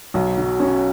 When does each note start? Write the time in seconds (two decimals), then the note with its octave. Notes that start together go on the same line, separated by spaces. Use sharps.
0.14 B1
0.38 F#3
0.60 C#4